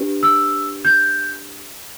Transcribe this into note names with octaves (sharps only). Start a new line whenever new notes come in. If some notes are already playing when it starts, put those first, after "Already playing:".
Already playing: D4 G4 B4
E6
G6